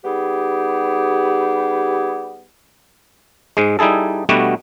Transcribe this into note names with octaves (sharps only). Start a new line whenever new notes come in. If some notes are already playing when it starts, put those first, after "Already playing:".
G3 B3 D#4 G4 G#4
G#2 G#3
G3 D#4 E4 G#4 A4
B2 G3 A3 B3 D4 F#4